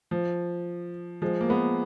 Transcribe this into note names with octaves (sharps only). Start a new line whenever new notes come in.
F3
F3 G#3
A#3
G#3 B3